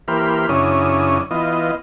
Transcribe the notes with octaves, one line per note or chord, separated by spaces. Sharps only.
E3 A#3 G4 C5 B5 F6
F#2 C#3 C#4 D4 E4 D#6
E3 B3 F4 D#5